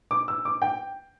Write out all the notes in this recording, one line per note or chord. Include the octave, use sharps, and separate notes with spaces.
D6
E6
D6
G5